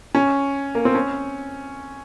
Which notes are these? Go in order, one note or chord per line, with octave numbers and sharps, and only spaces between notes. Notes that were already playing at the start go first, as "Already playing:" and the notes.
C#4
A#3
C4
C#4